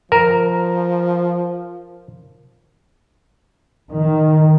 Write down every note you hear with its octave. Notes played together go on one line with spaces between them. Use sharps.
F3 A#4 A#5
D#3